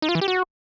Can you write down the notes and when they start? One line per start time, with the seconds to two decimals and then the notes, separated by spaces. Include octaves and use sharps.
0.02 D#4
0.09 F4
0.15 E3
0.21 G4
0.28 F#4